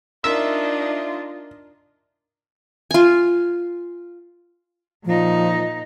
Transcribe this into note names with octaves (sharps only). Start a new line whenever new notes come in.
D4 D#4 F4 A#4 E5
F4 G#5
A#2 F3 D#4